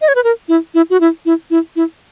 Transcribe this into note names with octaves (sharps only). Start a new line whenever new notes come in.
D#5
C#5
B4
A#4
E4
E4
F#4
E4
E4
E4
E4